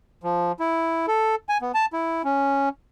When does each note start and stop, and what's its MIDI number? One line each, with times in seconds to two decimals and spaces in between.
0.23 0.52 53
0.60 1.06 64
1.07 1.35 69
1.49 1.58 80
1.61 1.72 59
1.74 1.86 81
1.93 2.22 64
2.24 2.69 61